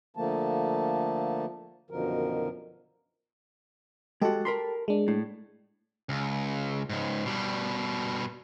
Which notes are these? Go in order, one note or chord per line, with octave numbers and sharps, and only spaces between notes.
D3 F3 A3 A#3 A5
F#2 B2 D3 D#3 F3 A#4
G#3 F#4 G4 A4 A5
A#4 B5 C6
G#3 D4
A2
C#2
C#2 G#2
B2 G3